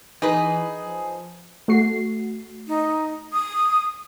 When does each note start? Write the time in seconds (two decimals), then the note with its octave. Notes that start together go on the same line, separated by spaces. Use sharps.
0.22 E3 D#4 G#4 B4
0.78 F3
1.68 A3 F#4 C7
2.68 D#4
3.33 D#6